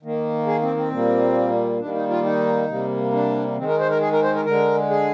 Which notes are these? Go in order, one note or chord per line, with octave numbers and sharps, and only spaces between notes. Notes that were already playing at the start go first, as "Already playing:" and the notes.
D#3 A#3
G#4
C4
C4
A#2 G3 A#3
D#3 G3 A#3 D4
D#4
F4
D#4
C3 G3 A#3
D4
D#3 G#3 C4
A#4
C5
A#4
G#4
A#4
C5
A#4
D3 G#3 A#4
G#4